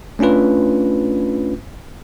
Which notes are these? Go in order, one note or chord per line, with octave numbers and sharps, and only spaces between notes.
A3 C#4 D4 F4 B4